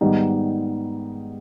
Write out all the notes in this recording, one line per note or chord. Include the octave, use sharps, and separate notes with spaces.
G#2 D#3 G3 B3 D#4